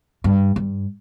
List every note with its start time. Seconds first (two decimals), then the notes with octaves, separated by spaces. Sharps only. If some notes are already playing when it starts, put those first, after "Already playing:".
0.24 G2
0.56 G2